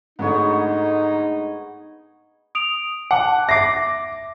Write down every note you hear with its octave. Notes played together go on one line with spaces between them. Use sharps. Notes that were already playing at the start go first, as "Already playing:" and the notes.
G#2 D3 A3 B3 D#4 G#4 C#5
D#6 D7 F7
F#5 A5 D6
E5 D6 A#6 C7